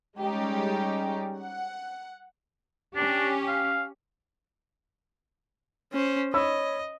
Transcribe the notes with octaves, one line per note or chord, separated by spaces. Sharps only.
G3 G#3 C#4 D#4 G4
F#5
C#4 D4 G4
F5
C#4 C5
C#5 D#5 B5 E6